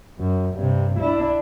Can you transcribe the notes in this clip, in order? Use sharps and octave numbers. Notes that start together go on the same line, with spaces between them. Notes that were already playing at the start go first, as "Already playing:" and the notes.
F#2
G2 C3
D4 E4